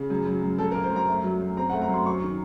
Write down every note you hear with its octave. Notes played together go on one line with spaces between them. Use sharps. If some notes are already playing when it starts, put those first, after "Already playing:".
Already playing: C#3
F#2
F#3
F#2
F#2 A4
A#4
A#3
C5
F#2 A#5
A3
F#3
F#2
C4 A#5
F#5
A3
A#5
F#2 C6
F#3 C#6
D#3